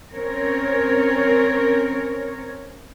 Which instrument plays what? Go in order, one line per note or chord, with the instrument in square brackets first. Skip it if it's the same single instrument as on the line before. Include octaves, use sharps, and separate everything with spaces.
[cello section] C4 C#4 A#4 C#5